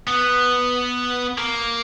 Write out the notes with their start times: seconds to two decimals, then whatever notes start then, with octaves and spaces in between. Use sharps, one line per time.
0.07 B3
1.38 A#3